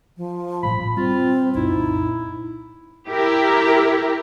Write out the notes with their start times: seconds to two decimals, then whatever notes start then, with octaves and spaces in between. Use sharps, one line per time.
0.17 F3
0.63 A1 G2 A#2 B5
0.97 G3 C4 F4
1.55 C2 F#2 A#2 D#4 E4
3.08 E4 G4 A#4